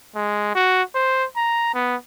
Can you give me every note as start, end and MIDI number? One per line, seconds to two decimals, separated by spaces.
0.15 0.50 56
0.55 0.82 66
0.95 1.25 72
1.36 1.71 82
1.74 1.96 59